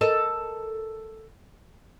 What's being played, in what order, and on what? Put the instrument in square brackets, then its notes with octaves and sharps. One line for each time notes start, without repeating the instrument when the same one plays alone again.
[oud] A4 A#4 D#5